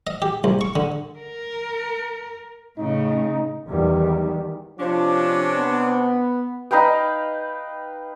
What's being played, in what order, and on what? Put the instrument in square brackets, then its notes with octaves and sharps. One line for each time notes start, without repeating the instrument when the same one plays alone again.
[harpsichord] D#5
G4
C2
C#6
D3
[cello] A#4
[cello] A2 C#3 [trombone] D#4
[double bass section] E2 D#3 G3
[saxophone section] C3 C#4 D4 [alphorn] F3
[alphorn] B3
[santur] D#4 B4 F5 G5